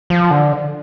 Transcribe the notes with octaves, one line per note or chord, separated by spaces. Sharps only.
F3
D3